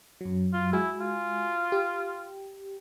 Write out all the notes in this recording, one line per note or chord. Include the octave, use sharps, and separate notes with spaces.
F#2 F#3
F4
G#3 E4 F#4 G#5
F4
G4